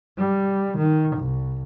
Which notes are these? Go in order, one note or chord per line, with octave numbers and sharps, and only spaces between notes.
G3
D#3
C2